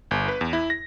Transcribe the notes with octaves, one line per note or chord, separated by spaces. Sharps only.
G1
B4
E2
E4
A#6